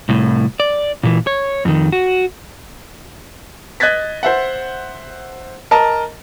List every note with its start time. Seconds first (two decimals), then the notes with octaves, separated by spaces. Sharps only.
0.09 C2 A2
0.60 D5
1.03 A#2 E3
1.27 C#5
1.65 F2 D#3
1.92 F#4
3.80 D#5 F#6 G#6 A6 B6
4.23 C5 E5 F#5
5.71 A#4 D#5 A5 A#5